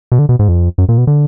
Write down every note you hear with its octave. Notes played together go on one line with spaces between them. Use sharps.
B2
D3
B2
G#2
F2
F#2
A#2
B2
D3